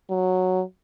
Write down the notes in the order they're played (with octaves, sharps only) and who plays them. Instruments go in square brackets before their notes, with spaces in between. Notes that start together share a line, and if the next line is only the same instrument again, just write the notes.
[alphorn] F#3